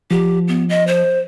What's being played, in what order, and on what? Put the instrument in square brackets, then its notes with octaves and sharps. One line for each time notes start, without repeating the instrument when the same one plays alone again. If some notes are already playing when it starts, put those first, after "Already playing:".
[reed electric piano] F3 [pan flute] G4
[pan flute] B3
D#5
C5